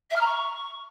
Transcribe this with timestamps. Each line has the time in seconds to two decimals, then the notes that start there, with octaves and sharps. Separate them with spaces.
0.10 E5
0.15 F6
0.20 A#5
0.26 C#6